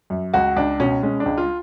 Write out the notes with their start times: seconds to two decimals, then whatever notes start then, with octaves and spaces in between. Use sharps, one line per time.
0.10 F#2
0.34 C#2 F#4
0.56 C#2 D4
0.80 B2 C#4
1.02 G#3 C#4
1.20 D4
1.26 C#2
1.38 F4